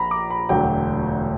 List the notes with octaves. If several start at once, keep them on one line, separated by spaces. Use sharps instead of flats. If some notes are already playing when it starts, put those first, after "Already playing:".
Already playing: A#1 A#5 B5
D6
B5
E1 D2 D3 F#3 G5